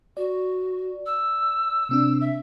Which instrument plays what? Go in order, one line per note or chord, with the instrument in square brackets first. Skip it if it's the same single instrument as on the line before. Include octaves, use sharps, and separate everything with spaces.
[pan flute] F#4 [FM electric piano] D5
[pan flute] E6
[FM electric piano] C3 C4 D4
[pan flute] E5